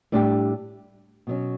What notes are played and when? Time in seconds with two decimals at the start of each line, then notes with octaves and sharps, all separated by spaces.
0.12 A2 G3 D4 G4
1.27 B2 F#3 C#4